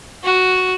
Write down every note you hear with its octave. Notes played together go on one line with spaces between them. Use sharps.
F#4